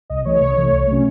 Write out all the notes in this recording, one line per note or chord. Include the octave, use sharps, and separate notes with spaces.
C2 D#5
C3 E3 A3 C#5
C2
C3 E3 A3
C2
C3 F#3 A3 C#4